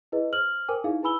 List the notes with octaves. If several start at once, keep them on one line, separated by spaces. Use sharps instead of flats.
E4 G#4 B4 D#5
C5 F6 F#7
A#4 C5 G5 G#5 D6
D#4 E4 G#4 F5
E4 B4 G#5 B5 E6 G7